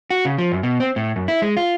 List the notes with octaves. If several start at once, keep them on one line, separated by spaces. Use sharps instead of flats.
F#4
C#3
F3
F#2
B2
C4
A2
F#2
E4
G#3
F4